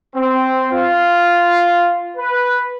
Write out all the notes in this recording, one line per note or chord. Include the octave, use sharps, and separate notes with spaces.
C4
F4
B4